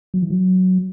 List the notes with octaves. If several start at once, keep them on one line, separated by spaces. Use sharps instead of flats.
F#3
E3
F#3